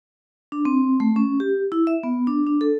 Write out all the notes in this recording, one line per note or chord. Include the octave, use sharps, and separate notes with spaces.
D4
C4
A3
C#4
G4
E4
E5
B3
D4
D4
A4